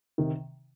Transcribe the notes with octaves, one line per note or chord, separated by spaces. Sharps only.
C3 D#3